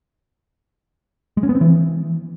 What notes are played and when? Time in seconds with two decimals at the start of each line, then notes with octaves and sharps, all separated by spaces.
1.37 G#3
1.43 C#4
1.49 B3
1.55 C4
1.61 E3